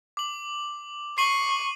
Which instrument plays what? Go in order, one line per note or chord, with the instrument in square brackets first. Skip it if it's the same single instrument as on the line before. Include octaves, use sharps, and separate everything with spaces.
[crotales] D6 F#7
[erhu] C#6 [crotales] C7 D#7 F#7